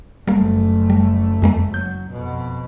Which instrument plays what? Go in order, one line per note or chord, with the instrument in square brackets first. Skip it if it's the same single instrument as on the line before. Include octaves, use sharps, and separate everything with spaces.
[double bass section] F#1 F#2 A3 [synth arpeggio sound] G3 A#3
[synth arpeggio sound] G3
F2 G#3 A#3
[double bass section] F#3 [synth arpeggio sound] G6
[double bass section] F2 B2